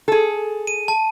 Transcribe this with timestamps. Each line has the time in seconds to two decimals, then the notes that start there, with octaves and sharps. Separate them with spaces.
0.08 G#4 A4
0.67 D#7
0.88 A5